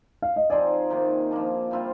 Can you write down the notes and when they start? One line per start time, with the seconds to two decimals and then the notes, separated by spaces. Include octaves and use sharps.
0.22 F5
0.36 D#5
0.50 F3 C4 D#4 G#4 D5
0.90 C3 D#3 A#3
1.31 F3 A#3 D4
1.71 C3 G3 C4 F4